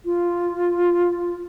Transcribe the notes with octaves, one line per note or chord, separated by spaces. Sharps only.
F4